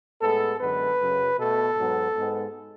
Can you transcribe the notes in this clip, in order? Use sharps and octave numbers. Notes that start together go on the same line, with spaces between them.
A2 G#3 B3 A4
F#2 D3 G#3 B3 B4
F#2 C#3 F#3
B2 A3 A4
G#2 F#3 B3
G#2 G#3 B3